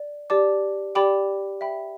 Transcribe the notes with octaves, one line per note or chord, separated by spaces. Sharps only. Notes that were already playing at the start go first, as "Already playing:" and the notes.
Already playing: D5
G4 D5 A5 D6
G4 D5 G5 B5 D6
E5 G5 B5